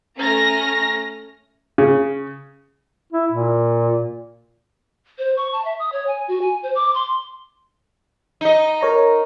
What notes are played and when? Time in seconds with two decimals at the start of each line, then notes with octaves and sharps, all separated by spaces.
0.18 A3 C#4 A#5 F6 A#6
1.78 C#3
3.13 E4
3.32 A#2
5.18 C5
5.37 C#6
5.53 A5
5.65 E5
5.79 D#6
5.92 C#5
6.07 G#5
6.28 F#4
6.42 G#5
6.63 C5
6.75 D6
6.94 C6
8.41 D#4 D#5
8.81 A#4 C#5 A#5